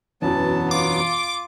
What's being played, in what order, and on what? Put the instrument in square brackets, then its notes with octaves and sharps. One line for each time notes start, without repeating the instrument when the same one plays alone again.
[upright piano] E1 F#2 E3 [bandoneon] F#3 B3 [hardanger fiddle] A5
[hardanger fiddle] F4 [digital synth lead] D6